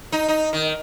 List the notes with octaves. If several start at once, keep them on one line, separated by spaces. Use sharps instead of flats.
D#4
D#4
D#3